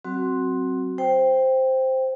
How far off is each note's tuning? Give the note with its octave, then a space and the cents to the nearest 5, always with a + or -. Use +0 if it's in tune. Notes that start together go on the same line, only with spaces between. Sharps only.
F#3 +15 C4 +5 F#4 +0
C5 +0 G5 +0